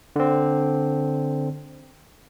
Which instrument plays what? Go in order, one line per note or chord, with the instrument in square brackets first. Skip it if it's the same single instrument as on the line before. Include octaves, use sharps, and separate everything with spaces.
[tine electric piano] D3 C4